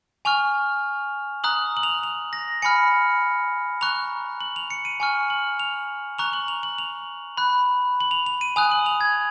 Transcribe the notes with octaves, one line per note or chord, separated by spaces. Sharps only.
G#5 C#6 F6 F7
A#5 D#6 F#6 F#7
F#7
F7
F7
A#6
G#5 B5 F6 C#7
A#5 C#6 F#6 F7
F#7
F7
C#7
D#7
G#5 C#6 F6
F#7
F7
A#5 C#6 F#6 F7
F#7
F7
F#7
F7
B5 F#6
F#7
F7
F7
D#7
G#5 D#6 F#6 F7
F#7
F7
G#6